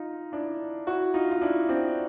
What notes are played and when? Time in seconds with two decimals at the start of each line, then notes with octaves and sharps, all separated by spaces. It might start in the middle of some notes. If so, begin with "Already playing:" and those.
Already playing: D#4 F4
0.32 D4 E4
0.87 E4 F#4
1.14 D#4 F4
1.31 F4
1.42 D4 E4
1.69 C4 D4